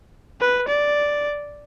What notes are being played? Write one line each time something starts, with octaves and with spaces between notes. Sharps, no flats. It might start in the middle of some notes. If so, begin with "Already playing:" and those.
B4
D5